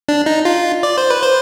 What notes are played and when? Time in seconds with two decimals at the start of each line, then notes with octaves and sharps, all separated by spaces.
0.08 D4
0.26 D#4
0.45 F4
0.83 D5
0.98 C5
1.10 B4
1.23 C5